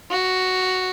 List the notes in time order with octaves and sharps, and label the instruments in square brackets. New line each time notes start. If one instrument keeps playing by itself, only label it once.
[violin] F#4